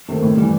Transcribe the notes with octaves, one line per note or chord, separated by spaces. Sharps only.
C3 D#3 A3
A2
E3 G3